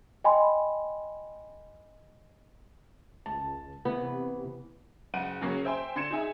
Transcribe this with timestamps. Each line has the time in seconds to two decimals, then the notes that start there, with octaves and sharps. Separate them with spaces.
0.24 D#5 G5 G#5 B5 C6
3.26 C#2 A5
3.85 C3 E3 B3
5.14 F#1 F#5 D#7
5.41 C#3 F#3 A#3 C#4
5.65 C5 E5 G5 G#5 C6
5.96 D3 C6 G#6 C#7 E7
6.11 D#4 G#4 E5 G#5